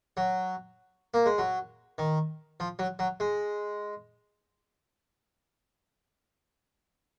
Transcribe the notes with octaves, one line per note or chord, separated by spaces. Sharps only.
F#3
A#3
G#3
F#3
D#3
F3
F#3
F#3
G#3